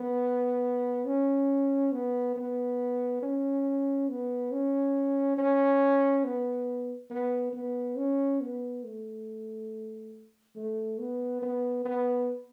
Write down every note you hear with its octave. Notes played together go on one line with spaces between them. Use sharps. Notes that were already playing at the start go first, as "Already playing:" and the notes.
Already playing: B3
C#4
B3
B3
C#4
B3
C#4
C#4
B3
B3
B3
C#4
B3
A3
A3
B3
B3
B3